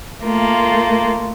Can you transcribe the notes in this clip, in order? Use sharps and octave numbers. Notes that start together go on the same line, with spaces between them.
A3 A#3 F4